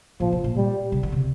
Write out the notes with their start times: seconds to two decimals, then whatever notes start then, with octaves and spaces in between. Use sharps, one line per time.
0.20 A#2 F3
0.32 A2
0.44 A#2
0.57 G3
0.92 C3
1.03 D3
1.12 C3